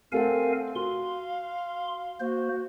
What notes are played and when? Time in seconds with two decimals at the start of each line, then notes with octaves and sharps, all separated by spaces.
0.12 A3 C4 A4 A#4 F5 F#5 G#5
0.75 F#4 F5 C6
2.20 A#3 F#4 C5